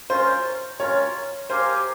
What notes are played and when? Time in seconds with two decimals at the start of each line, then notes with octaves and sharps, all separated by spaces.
0.10 C#4 F4 A#4 C5
0.80 C#4 F4 A#4 C#5
1.50 G4 A#4 C5 F5 G#5